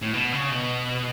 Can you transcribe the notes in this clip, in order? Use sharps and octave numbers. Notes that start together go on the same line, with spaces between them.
A2
B2
C#3
B2